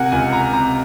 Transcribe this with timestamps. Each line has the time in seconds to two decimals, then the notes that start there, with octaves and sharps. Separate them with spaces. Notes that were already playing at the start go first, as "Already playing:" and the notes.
Already playing: C3 A#4 F#5 G#5
0.12 C#2 G#5
0.32 A#5
0.53 C3 A#5